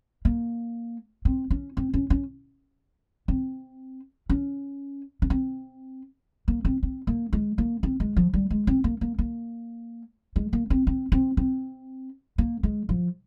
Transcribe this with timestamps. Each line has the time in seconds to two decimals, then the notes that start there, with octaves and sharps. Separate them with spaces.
0.25 A#3
1.25 C4
1.50 C#4
1.77 C4
1.94 C#4
2.10 C#4
3.28 C4
4.29 C#4
5.22 C#4
5.30 C4
6.48 A#3
6.65 C4
6.83 C4
7.07 A#3
7.33 G#3
7.58 A#3
7.83 C4
8.00 G#3
8.16 F3
8.33 G3
8.50 G#3
8.67 C4
8.84 A#3
9.01 A#3
9.19 A#3
10.36 G#3
10.53 A#3
10.70 C4
10.87 C4
11.12 C4
11.37 C4
12.38 A#3
12.63 G#3
12.89 F3